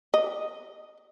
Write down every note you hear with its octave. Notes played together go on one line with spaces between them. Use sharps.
D#5